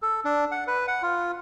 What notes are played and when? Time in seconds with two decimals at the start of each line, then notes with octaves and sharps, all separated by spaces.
0.02 A4
0.25 D4
0.51 F#5
0.67 B4
0.88 F#5
1.02 F4